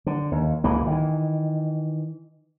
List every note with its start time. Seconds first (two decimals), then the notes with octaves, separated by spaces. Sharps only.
0.06 D3
0.32 D#2
0.64 D1 C#2 E3 A#3
0.87 D#3 E3